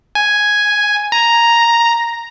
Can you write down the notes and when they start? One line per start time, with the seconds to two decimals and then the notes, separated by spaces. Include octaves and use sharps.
0.15 G#5
1.12 A#5